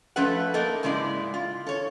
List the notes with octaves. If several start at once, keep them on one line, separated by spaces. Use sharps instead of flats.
F3 A3 C#4 A4 B4 F#5
A#3 D#4 A4 A#4 D#5
G#2 C#3 G#3 E4 D5
F4
A4 C#5